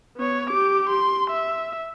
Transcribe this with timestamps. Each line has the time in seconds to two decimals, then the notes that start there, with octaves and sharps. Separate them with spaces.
0.17 B3 C#5
0.50 G4 D6
0.89 C6
1.30 E5